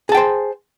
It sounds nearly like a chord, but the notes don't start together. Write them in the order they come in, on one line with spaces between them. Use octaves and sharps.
G#4 A5 G5 C5